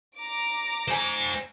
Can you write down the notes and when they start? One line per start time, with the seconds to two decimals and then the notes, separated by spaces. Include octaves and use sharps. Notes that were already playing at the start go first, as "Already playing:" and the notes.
0.18 A#5 D6
0.88 C5 G#5